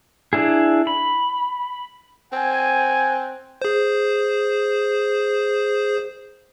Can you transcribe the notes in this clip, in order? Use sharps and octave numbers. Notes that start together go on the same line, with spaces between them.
D4 E4 G#4
B5
C4 F#5 G#5
G#4 C5